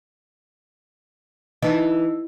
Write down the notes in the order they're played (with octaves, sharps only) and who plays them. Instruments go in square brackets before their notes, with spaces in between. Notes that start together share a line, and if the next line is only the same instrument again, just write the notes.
[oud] E3 [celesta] D#4 D#5